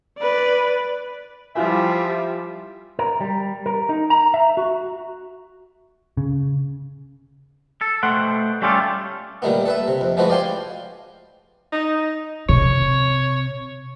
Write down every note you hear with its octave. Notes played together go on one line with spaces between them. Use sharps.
B4 D5
F3 G3 E4 F4 E5 G#5
A#4
G3
A#4
D#4
A#5
E5
F#4
C#3
A4
B2 A3 C5 F#5 G5
G3 A3 C#4 F4 G4 A4
A#2 D#3 G3 A3 B3
A4 B4 E5
C3
F2
E3 F3 G#3 A3 F#4 B4
D5 F5 G5 G#5 C6
D#4
C3 C#5